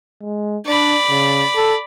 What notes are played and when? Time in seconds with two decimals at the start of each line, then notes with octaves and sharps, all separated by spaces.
0.22 G#3
0.66 D4 D5 B5
1.10 C#3
1.56 A4